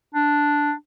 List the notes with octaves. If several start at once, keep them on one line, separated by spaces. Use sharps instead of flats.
D4